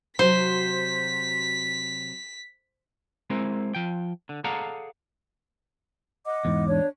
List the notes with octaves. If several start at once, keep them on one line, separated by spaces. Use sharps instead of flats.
C3 F#3 F#4 C5 B6
G#3 C4 E4 A#4
F3 G5
D3
G#4 A4 D5 F5 F#5 A#5
D#5 F#5 D6
E2 G#2
D4 C#5